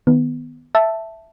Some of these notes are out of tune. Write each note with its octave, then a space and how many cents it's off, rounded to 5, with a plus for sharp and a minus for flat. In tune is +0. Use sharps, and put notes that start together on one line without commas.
D#3 +0 B3 +0
E5 +0 A5 +0